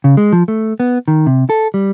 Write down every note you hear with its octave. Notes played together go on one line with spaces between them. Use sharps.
C#3
G#3
F3
A3
B3
D#3
C3
A4
G3